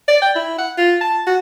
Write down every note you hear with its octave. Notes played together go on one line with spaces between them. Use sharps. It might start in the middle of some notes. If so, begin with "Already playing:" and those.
D5
G5
E4
F#5
F4
A5
F#4